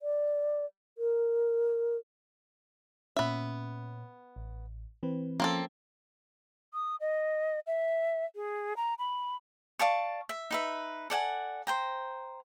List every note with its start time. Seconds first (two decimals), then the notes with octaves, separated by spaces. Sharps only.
0.01 D5
0.98 A#4
3.16 A#2 B3 C#4 E5
4.36 A1
5.03 E3 C4 B4
5.40 F3 A#3 C4 C#4 F4 A4
6.72 D#6
7.00 D#5
7.67 E5
8.35 G#4
8.76 A#5
8.99 B5
9.79 D5 F5 A5 C#6
10.29 E5
10.51 D#4 B4 E5
11.10 A4 D5 F#5 G#5
11.67 C5 G5 A#5